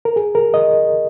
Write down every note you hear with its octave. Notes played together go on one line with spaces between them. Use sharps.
A#4
G#4
A#4
D#5